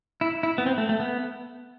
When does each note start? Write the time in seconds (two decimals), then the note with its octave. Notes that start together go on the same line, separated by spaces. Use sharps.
0.21 E4
0.43 E4
0.58 B3
0.66 C4
0.78 A3
0.89 A3
1.00 B3